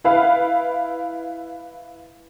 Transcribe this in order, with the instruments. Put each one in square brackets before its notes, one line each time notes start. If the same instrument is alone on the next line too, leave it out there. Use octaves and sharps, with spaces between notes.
[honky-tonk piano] E4 B4 F5